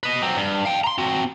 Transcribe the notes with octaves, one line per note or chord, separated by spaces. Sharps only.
B4 D#5
F#3 C4
G2
F5 G5
A#5 C6
C4 F#4